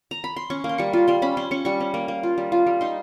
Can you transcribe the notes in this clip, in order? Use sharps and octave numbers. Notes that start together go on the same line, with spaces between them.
A#5
B5
C6
C#4 C#6
A#3
C6
G3 C#6
F4
G3 C6
C#4 B5
C#4 C6
C#4 C#6
G3 C#6
C#4
A#3
A#3
F4
G3
F4
G3
D#4 C6